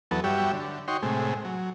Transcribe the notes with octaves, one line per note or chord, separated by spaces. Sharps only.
E2 F#3 B3 A4
G2 G3 F#4 G4 C#5 E5
D3
D#4 F#4 C#5 G5 C6
A2 C3 G#3
F#3